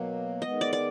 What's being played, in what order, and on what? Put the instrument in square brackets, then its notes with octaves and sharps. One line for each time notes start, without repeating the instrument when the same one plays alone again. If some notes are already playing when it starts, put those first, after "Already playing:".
Already playing: [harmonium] B2 F#3 A#3
[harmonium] D#3 G#3 B3 [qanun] D#5
[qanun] D5
D5